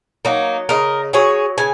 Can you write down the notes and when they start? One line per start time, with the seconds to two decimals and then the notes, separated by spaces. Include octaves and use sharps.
0.25 F#3 A#3 D#4
0.69 C#3 A#4 D#5
1.13 F#3 G#4 C#5
1.58 C#3 G#5